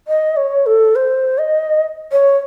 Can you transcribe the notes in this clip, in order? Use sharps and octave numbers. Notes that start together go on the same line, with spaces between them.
D#5
C#5
A4
C5
D#5
C#5